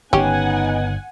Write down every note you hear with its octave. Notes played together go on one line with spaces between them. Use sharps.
G1 C#3 B3 C#4 D#4 G4 F#5 G#5